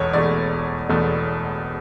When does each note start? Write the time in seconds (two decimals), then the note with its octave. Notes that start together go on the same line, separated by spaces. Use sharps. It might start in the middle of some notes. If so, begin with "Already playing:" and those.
Already playing: E1 E2 B2 A3 C#5
0.13 E1 E2 B2 A3 D5
0.89 E1 E2 B2 A3